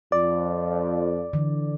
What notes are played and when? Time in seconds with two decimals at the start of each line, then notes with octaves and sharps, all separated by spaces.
0.12 F2 D5
1.33 D3 E3